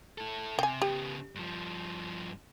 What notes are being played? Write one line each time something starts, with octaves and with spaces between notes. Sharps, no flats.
E4 A4
C3 G5 G#5
C#3 B3 G4
G2 F3